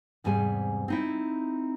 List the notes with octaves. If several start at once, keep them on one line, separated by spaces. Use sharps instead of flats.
E2 G#2 C3 G3 G#5
C4 D#4 E4